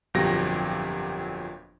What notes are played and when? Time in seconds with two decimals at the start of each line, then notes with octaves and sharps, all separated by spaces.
0.14 G1 F2 A#2 F#3 G4 A#6